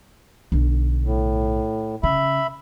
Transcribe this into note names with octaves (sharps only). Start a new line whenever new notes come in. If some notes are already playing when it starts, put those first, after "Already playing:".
B1 D3
A2
C#3 E5 B5